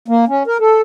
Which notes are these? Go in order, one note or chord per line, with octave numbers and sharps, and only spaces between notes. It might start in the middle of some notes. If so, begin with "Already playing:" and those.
A#3
C#4
A#4
A4